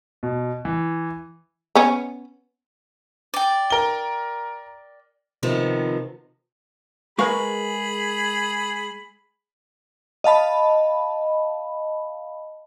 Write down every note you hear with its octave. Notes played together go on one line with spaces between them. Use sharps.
B2
E3
B3 C#4
D5 G5
A#4 G7
C3 D#3 F3 B3 C4
G#3 G#4 A#4 B4 F5 B5 C#6
D#5 F5 A5 B5